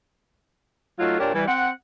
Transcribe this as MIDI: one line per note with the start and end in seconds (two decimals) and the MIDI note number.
0.99 1.18 54
0.99 1.18 57
0.99 1.18 63
0.99 1.18 65
1.19 1.32 46
1.19 1.32 62
1.19 1.32 67
1.19 1.32 70
1.19 1.32 73
1.34 1.45 52
1.34 1.45 55
1.48 1.71 60
1.48 1.71 78